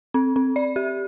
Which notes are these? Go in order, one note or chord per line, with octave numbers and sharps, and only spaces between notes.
C4
C4
D5
G4